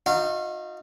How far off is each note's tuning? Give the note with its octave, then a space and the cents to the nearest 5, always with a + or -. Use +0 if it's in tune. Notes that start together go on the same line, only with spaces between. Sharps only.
D#4 +0 F#4 -45 F5 -25